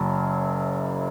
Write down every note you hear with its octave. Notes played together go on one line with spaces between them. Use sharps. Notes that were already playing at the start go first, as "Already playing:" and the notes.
Already playing: F#1 F#2